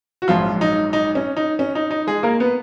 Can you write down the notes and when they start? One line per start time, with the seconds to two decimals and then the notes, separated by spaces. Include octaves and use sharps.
0.22 F#4
0.28 A#1 G#2 F3 F#3 F4
0.61 D#4
0.93 D#4
1.15 C#4
1.37 D#4
1.59 C#4
1.75 D#4
1.91 D#4
2.07 G#3 G#4
2.23 A#3 A#4
2.40 B3 B4